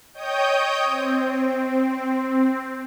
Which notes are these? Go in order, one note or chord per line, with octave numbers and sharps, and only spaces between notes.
C#5 D#5 G5 D#6 G6
C4